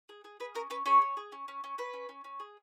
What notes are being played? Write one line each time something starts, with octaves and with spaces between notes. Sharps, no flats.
G#4
G#4
G#4 B4
C#4 A#4
C#4 B4
C#4 G#4 C#5
C#4
G#4
C#4
C#4
C#4
C#4 B4
C#4
C#4
C#4
G#4